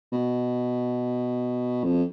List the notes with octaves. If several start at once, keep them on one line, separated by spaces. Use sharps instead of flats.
B2
F2